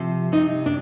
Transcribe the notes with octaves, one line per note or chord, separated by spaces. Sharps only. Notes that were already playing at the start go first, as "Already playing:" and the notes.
Already playing: C3 F3
C3 D#4
D4